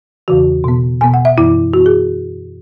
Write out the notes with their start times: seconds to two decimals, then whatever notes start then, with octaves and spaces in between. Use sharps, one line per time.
0.28 E2 C#3 E3 F#4
0.64 B2 B3
1.01 B2 B3 G#5
1.14 F#5
1.25 E5
1.38 F#2 E3 B3 E4
1.73 F#2 E3 B3 F#4
1.86 G#4